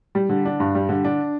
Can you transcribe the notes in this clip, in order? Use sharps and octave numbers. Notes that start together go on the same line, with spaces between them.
G3
D3
D4
G2
G3
D3
D4